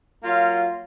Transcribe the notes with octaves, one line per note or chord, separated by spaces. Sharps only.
F#3 A#3 F4